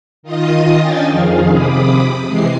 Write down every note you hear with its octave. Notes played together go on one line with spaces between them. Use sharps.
D#3 F4 D#5 D#6
C#4 D4 D#5 G5 G#5 A6
F2 D#3 F3 G#4 F5
C3 B5 D6 D#6
C3 E3 G#3 C7